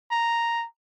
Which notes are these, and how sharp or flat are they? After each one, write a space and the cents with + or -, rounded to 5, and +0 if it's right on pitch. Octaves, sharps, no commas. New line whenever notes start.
A#5 +0